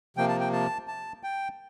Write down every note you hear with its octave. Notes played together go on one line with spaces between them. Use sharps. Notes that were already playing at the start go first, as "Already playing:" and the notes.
C3 F3 A#3 G5
A5
G5
A5
A5
G5